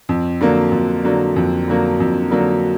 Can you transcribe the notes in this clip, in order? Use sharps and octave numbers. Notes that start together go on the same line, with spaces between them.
F2
D3 F#3 A#3
F2
D3 F#3 A#3
F2
D3 F#3 A#3
F2
D3 F#3 A#3